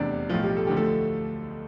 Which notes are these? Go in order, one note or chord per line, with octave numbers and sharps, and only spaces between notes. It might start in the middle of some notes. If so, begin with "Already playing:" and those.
Already playing: F1 E2 C3 G3 D4 D5
B1 A2 F3 F4
G3 G4
A4
D2 D3 F3 G4
A3 A4